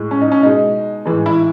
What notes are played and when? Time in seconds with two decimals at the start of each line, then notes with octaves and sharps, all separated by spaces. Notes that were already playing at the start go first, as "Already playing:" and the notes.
Already playing: A2 G#3
0.11 C#4
0.21 D#4
0.32 C#4
0.43 B2 G#3 D#4
1.05 A2 E3 G#3
1.26 E4